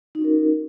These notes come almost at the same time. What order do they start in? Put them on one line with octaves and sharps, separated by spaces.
D#4 F#4 C#4 A#4